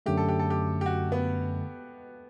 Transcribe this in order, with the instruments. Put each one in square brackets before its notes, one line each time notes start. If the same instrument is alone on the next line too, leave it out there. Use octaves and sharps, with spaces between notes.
[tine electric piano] F#2 D3 A3 [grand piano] G4
[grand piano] A4
G4
A4
G4
G4
F#4
B3